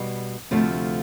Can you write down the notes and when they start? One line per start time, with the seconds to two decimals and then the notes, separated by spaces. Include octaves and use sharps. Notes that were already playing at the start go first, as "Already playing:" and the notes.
Already playing: B2 G3
0.51 D2 C3 F3 A3